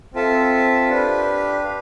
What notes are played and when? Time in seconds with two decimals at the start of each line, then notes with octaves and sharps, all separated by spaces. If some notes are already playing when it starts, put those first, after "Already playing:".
0.14 C4 F4 A4 E5 A5
0.89 D4 G4 B4
1.64 F5